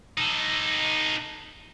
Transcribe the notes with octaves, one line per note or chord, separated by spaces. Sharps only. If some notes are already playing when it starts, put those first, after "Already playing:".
D#4 A4